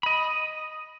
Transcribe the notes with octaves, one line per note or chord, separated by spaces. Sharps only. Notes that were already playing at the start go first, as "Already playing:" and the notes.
D#5 B5